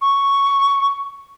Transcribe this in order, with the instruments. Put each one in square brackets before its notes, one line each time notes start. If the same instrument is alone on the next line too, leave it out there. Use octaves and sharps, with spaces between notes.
[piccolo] C#6